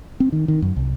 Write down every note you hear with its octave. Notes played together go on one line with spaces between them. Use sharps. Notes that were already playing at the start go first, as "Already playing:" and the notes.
C4
D#3
D#3
F#2
C2